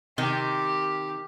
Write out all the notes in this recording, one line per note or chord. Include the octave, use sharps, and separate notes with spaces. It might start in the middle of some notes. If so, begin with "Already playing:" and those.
C3 D#3 G4